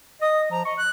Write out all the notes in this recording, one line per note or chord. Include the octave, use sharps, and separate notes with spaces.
D#5 D#6
F3 A#5
D#5 C#6
F#6